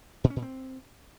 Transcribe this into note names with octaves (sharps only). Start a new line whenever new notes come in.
A#2
C#4
A#2
C4